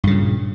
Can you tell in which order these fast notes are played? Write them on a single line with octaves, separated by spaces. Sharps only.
G2 C#3 A#2